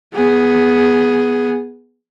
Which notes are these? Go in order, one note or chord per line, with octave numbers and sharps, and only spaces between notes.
B3 G#4